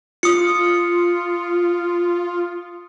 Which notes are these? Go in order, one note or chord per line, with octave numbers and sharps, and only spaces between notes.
F4 D#6 C#7